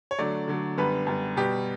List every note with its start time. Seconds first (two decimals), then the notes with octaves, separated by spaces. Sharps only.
0.11 C#5
0.18 D3 F#3 A3 D5
0.48 D3 F#3 A3
0.78 F#2 D3 G3 B3 B4
1.07 F#2 D3 G3 B3
1.37 B2 G3 B3 G4